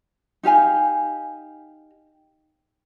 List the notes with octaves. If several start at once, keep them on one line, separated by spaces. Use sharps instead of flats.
D#4 G4 F5 G#5